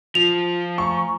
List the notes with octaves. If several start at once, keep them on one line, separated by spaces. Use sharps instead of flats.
F3 F4 F7
A3 G#5 A#5 C#6